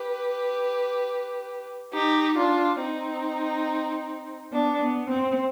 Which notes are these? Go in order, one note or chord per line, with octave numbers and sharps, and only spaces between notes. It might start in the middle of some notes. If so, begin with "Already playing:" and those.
Already playing: G4 B4
D#4 G4
D4 F4
C4 D#4
B3 D4
B3
C4